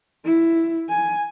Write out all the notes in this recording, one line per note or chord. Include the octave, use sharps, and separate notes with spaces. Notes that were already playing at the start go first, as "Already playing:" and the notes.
E4
G#5